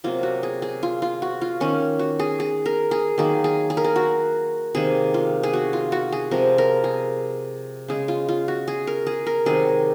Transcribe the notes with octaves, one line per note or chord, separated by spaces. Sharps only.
C3 F#3 A#3 F4
F#4
G#4
G#4
F4
F4
F#4
F4
D#3 A#3 C#4
F#4
G#4
G#4
A#4
G#4
D#3 F#3 A#3 G#4
G#4
G#4
A#4
G#4
F#4
C3 D#3 A#3 G#4
F4
G#4
F#4
F4
F#4
G#4
C3 F3 G#3 A#4
A#4
G#4
C#3 G#3 G#4
F4
F4
F#4
G#4
A#4
G#4
A#4
C3 D#3 F#3 G#4